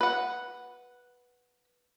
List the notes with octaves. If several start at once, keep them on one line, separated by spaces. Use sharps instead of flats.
B4 F#5